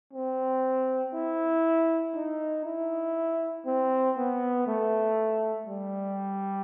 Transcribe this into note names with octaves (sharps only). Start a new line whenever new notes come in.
C4
E4
D#4
E4
C4
B3
A3
G3